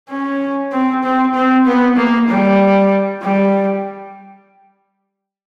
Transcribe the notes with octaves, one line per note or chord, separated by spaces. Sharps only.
C#4
C4
C4
C4
B3
A#3
G3
G3